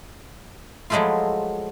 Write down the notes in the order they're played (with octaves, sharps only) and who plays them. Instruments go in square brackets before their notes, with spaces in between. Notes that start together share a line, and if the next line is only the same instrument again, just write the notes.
[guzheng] F3 F#3 G#3 A3 E4 F4